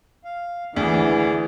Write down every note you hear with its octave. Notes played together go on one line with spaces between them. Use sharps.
F5
D2 E3 G#4 D5